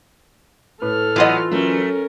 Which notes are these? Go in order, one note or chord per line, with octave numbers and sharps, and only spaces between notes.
A2 A4 B4 F6
E3 F#3 B3 F4 D#5
F#3 A3 C#4 A#4